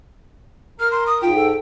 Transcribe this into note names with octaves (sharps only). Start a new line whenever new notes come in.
A#4 F6
C6
D#6
G#2 F4 G5
A4